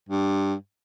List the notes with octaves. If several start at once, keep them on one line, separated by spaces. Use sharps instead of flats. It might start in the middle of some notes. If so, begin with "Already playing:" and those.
G2